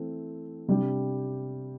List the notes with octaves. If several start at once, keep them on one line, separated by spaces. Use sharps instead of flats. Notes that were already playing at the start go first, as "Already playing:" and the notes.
Already playing: E3 A3 C4
C3 G3 D4 G4